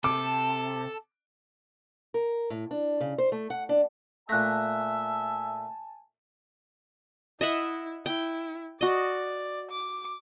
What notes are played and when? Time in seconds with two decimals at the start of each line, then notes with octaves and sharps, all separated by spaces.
0.04 C3 A4 A5 D6
2.14 A#4
2.50 A2
2.71 D4
3.01 C#3
3.18 C5
3.32 A3
3.50 F#5
3.69 D4
4.29 A#2 A3 E5 G#5 A5 F#6 A#6
7.41 E4 D#5 E5 F#5
8.06 E4 G5
8.81 F#4 D5 D#5
9.71 D6